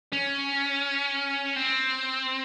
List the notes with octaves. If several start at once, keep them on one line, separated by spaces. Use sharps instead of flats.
C#4
C4